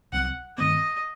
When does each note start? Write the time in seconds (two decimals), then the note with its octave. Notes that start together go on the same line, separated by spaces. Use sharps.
0.12 C2 C3 F#3 C4 F#5
0.58 G2 D#3 A3 C4 D#5